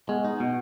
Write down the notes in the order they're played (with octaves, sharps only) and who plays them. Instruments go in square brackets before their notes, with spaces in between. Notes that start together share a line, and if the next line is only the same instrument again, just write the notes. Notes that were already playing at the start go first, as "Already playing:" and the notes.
[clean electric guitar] G#3 [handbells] B3
[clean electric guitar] D#4
[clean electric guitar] B2 [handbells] B3